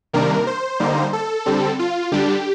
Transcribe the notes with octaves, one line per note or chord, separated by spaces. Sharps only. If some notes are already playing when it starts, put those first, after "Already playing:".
C3 D#3 G3 A#3 D4 A#4
C5
D3 G3 A#3 D#4
A4
D3 G3 C4
F4
D3 G3 D4 G4